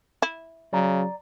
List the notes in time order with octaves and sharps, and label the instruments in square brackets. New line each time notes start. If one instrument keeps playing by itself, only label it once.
[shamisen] E4
[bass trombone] C#3 [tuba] F#3 [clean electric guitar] D5 A#5